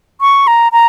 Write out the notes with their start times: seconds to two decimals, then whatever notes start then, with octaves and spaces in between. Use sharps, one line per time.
0.21 C#6
0.47 A#5
0.72 A#5